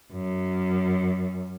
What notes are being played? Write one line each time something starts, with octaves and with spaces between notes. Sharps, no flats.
F#2